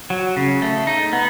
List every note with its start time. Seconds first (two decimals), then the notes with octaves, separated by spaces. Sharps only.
0.10 F#3
0.37 C#3
0.62 A3
0.87 D#4
1.13 B3